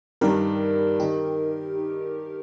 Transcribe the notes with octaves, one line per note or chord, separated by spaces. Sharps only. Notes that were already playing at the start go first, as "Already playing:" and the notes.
G2 D#3 G3 D4 G4 A#4
D#3 D#4 G4